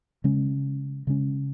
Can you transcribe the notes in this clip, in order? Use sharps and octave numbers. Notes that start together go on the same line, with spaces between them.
C#3 G#3 C#4
C#3 G#3 C#4